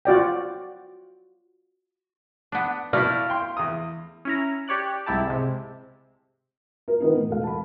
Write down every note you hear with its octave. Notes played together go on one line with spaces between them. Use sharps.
F4 F#4 D5 G5
B3 D4
B2 A3 E4 D5 F5
G5 C6
E2 D#6
C#4 E4 A#5
G4 C#5 D5 F#6
C2 G#2 E4 G4 A5
G#2 C3
A#4
D#3 E3 B3 A#4
A2
E1 A4 F5
A5 B5